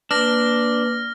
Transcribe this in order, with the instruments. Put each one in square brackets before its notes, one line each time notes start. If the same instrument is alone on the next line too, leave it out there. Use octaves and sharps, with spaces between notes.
[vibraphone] A#3 B4 [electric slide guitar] D4 [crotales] F6 A#6